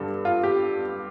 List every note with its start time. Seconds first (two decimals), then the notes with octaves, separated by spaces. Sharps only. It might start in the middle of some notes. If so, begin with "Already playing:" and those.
Already playing: G2 D3 G3 A4
0.25 F4
0.43 G4